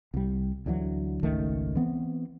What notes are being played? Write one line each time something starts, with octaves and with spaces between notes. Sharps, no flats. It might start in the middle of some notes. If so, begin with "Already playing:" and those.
C2 G3
D2 D3 E3 F#3
G#1 C#2 D#3 A3
E3 B3 C4